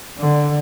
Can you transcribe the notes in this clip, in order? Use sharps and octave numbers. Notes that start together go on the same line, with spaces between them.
D3